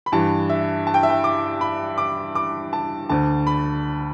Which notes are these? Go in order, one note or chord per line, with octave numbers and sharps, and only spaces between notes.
B5
G2 E3 A5
E5
A5
G5
E5
G5
D6
B5
D6
D6
A5
D2 D3 A5
B5